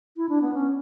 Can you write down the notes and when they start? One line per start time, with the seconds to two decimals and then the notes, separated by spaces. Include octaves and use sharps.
0.17 E4
0.29 D4
0.42 B3
0.54 C#4